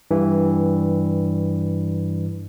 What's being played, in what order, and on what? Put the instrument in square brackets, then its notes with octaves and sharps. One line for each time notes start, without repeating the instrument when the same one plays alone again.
[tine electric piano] G2 E3